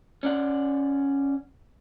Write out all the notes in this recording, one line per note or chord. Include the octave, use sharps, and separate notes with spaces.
C#4 D5 F#5